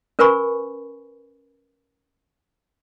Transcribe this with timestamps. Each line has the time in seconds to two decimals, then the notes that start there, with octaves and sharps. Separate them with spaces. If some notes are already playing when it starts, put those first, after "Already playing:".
0.19 C#4 A#4 B4 G#5 B5 C#6